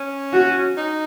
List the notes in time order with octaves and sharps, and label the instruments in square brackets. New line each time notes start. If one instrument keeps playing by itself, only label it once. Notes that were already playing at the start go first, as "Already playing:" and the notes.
Already playing: [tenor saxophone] C#4
[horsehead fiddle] F#4
[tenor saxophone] D#4